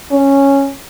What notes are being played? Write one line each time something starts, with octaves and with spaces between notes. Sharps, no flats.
C#4